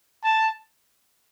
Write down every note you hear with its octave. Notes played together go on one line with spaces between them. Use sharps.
A5